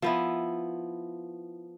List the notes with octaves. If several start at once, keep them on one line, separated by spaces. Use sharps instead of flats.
F3 B3 E4